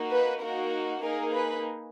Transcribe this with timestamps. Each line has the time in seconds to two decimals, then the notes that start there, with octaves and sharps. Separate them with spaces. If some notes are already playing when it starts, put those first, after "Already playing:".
Already playing: A#3 D#4 F#4
0.11 B4
0.41 A#3 D#4 F#4 A#4
1.02 A#3 D#4 G#4 A#4
1.32 B4